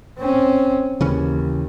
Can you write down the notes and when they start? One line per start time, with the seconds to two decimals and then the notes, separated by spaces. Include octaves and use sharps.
0.18 C4 C#4
1.01 D#2 C#3 E3 C#4